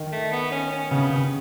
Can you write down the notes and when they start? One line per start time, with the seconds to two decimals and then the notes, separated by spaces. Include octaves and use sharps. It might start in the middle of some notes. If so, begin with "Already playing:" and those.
Already playing: D#3
0.12 A3
0.32 B3
0.51 C#4
0.71 C#4
0.91 C#3 B3
1.10 C#3